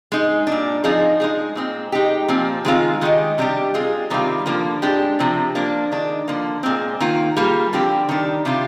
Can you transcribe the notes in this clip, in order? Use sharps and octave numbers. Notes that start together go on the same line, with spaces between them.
G#3 D#4 G#4
A#2 G3 D4
F3 C4 D#4 G#4
G#3 D#4 G#4
A#2 G#3 C4
G#3 D#4 G4
A#2 F3 C4
D#3 G#3 C4 F4
D#3 G#3 D#4 G4
C3 G3 D4 G4
G#3 C4 F4 G#4
C3 D#3 G3 C4 F4
D3 F3 A#3
G#3 D4 G4
C3 F3 C4
F3 A#3 D4
D#3 G#3 D4
D3 F3 A#3
A#2 G#3 C4
D#3 A#3 F4
G3 A#3 F4 G#4
D3 F3 C4 G4
D#3 G3 D4
C3 G3 D4 F4